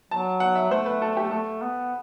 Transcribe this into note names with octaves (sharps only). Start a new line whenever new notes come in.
F#3 A5
F#5
E5
A3 C5
B4
A4
G4
A3 A4
B3